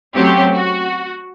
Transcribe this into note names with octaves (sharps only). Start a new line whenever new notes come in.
F#3 A3 C4 C#4 G4
F#4